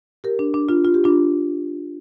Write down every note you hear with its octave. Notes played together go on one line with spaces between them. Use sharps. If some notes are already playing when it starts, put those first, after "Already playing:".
G4 A#4
D4
D4
D4 F4
F4
G4
D4 F4